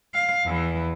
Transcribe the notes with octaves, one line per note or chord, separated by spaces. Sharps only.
F5
E2 E3